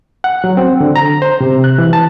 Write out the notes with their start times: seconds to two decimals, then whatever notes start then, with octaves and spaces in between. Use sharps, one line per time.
0.24 F#5
0.44 F#3
0.57 C4
0.80 D3
0.96 A#5
1.22 C5
1.41 C3
1.64 F#6
1.78 E3
1.93 A5